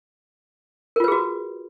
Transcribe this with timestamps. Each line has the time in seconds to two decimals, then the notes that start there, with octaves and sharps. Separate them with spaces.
0.96 A#4
1.00 F4
1.04 B4
1.08 G#4
1.12 F#4